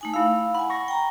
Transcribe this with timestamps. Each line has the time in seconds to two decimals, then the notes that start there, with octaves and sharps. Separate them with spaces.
0.01 A3 D#4 G#5
0.14 E4 F5 E6
0.55 F#5 G#5 B5
0.70 C#6 A#6
0.88 G5 A#5